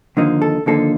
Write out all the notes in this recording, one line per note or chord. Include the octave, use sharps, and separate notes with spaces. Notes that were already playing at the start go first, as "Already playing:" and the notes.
D#2 D3 F3 A#3 D#4
A4
D#2 D3 F3 A#3 D#4 A4